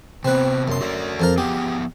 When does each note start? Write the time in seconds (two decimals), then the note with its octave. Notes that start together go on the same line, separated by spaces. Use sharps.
0.25 C3 B3 C4 B4
0.68 F#2 C6
0.81 F#4 A4 D5
1.20 F2 F3 A#4
1.38 F3 B3 G4 G#4